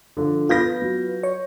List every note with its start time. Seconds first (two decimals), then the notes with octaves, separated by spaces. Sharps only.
0.17 D3 F3
0.49 B3 F4 B4 G6 A#6
0.82 F#3
1.23 C#5